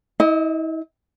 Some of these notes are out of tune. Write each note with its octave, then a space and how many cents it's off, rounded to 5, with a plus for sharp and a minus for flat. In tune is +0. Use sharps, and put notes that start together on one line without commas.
E4 -40 D#5 +0